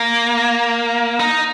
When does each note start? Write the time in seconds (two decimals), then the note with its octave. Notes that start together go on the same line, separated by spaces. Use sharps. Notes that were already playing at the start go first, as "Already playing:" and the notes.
Already playing: A#3
1.19 D#4